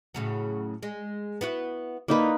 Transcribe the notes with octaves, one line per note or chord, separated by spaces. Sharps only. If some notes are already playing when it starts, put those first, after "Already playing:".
A2 C#3 F#3
G#3
B3 E4 F#4
D3 A#3 D#4 E4 B4